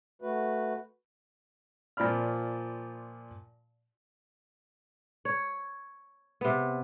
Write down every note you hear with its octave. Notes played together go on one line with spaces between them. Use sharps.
A3 F#4 B4
A#2 F3 D5 B5 F6
C#5
C3 B3